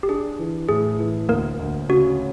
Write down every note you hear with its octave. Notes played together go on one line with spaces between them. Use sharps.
G4
D4 G#4
E3
A2 G#4
E3
D2 A#3 A#4
D2
C#3 F#4